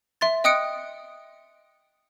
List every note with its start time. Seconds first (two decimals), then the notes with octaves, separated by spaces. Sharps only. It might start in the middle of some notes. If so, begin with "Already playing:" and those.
0.21 E5 C6 A6
0.44 D#5 G5 D#6 F#6 C#7 D7